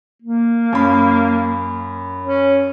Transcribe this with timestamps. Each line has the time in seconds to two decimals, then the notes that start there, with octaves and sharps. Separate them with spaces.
0.22 A#3
0.73 F#2 B5
2.24 C#4